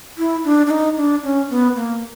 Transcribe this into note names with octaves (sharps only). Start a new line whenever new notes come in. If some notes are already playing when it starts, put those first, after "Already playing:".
E4
D4
D4
D#4
D4
C#4
B3
A#3